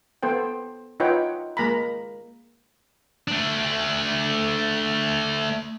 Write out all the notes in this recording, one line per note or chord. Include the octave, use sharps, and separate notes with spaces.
B3 A4 C5 G5
D#4 F4 B4 C#5 F#5 G5
G#3 A#3 A#5 B5
A3 D4